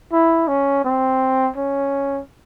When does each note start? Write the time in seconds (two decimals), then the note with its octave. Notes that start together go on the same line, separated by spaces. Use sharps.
0.12 E4
0.48 C#4
0.84 C4
1.56 C#4